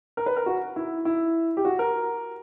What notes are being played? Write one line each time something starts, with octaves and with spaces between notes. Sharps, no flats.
A#4
B4
A#4
F#4
E4
E4
G4
F#4
A#4